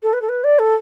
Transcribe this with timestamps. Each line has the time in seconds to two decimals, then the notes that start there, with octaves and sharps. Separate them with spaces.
0.03 A4
0.13 B4
0.21 A4
0.29 B4
0.44 D5
0.59 A4